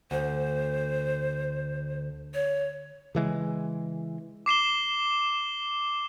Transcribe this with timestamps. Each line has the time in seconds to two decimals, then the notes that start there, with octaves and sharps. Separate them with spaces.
0.11 D2 C5
2.34 C#5
3.15 C#3 E3 G#3
4.46 D6 C7 E7 G7